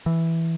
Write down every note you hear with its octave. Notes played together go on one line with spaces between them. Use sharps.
E3